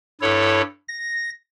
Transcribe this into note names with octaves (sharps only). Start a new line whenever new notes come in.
G2 E4 A4 C#5
A#6